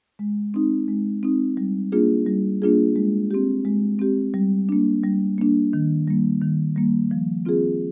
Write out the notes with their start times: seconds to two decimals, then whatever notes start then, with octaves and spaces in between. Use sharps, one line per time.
0.19 G#3
0.54 C4 D#4
0.88 G#3
1.23 C4 D#4
1.57 G3
1.92 A#3 D4 F4 G#4
2.27 G3
2.62 A#3 D4 F4 G#4
2.96 G#3
3.31 C4 G4
3.65 G#3
3.99 C4 G4
4.34 G3
4.69 A#3 D4
5.03 G3
5.38 A#3 D4
5.73 D#3
6.08 G3 A#3
6.41 D#3
6.76 G3 A#3
7.11 F3
7.45 C4 F4 G#4